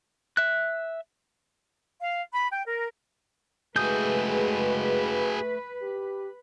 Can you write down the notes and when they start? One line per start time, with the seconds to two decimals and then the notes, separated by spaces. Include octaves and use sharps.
0.37 E5 F#6
2.00 F5
2.33 B5
2.52 G5
2.65 A#4
3.76 G#3 A3 F#4 G#4 B4 D#6 G6
5.82 G4